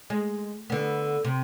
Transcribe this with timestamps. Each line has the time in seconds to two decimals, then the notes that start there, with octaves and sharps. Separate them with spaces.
0.10 G#3
0.70 D3 B3
1.24 C3